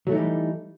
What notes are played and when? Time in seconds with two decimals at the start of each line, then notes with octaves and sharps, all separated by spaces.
0.07 F#3
0.09 A3
0.12 D#4
0.15 E3
0.17 G3